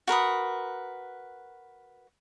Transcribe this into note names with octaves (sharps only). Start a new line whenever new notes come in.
F#4 A#4 B4 D#6